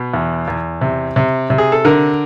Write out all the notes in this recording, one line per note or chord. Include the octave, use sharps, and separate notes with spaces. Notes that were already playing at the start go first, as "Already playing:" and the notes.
Already playing: B2 B4
E2
E2
C3
C3
C3
G#4
A4
D3 A#4